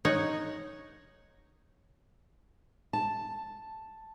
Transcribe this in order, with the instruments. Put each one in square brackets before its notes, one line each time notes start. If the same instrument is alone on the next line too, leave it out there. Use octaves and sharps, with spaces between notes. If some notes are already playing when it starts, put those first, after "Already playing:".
[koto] D#4 C#5 F#5
[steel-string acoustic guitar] A5